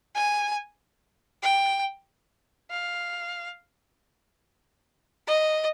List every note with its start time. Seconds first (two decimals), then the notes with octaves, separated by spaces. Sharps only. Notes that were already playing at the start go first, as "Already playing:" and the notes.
0.15 G#5
1.43 G5
2.71 F5
5.27 D#5